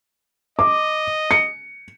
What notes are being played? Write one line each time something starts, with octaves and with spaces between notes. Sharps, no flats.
D#5 D6
C#7